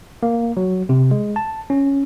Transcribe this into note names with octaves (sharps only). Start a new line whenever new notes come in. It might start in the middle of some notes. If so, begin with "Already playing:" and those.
A#3
F#3
C3
G#3
A5
C#4